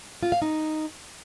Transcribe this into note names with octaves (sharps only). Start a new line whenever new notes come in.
F4
F5
D#4